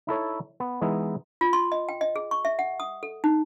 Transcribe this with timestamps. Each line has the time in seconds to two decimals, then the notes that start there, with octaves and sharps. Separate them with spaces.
0.07 D#4 E4 A4 C#5
0.60 B3
0.81 E3 G#3 B3 D#4 E4
1.41 F4
1.53 C6
1.72 D#5
1.89 G5
2.01 D#5
2.16 G#4
2.31 C#6
2.45 E5
2.59 F#5
2.80 D#6
3.03 A4
3.24 D#4